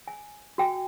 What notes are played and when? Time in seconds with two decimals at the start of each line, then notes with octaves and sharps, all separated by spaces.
0.08 G#5
0.58 F#4 G5 G#5